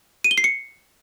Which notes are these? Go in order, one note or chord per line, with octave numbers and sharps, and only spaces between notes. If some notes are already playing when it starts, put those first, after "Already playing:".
D#7
G7
C7
C#7